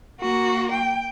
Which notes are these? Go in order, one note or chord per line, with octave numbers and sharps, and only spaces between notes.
A#3 F#4
G5